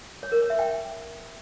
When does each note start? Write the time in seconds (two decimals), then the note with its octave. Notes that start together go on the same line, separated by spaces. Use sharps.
0.23 C#5
0.32 A#4
0.41 C#5
0.50 E5
0.59 G5